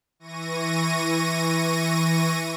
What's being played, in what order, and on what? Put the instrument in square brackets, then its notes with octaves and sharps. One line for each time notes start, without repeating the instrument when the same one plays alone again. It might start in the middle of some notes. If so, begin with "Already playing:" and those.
[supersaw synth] E3 C#6 A#6 D#7